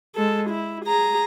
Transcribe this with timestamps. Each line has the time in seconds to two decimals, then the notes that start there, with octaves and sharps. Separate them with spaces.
0.15 G#3 A4
0.49 E4
0.85 G#4 A#5